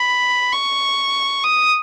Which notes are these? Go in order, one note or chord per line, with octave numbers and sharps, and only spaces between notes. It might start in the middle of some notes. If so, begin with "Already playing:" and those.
Already playing: B5
C#6
D#6